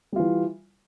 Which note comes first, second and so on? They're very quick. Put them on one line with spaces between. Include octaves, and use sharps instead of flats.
G3 F4 E3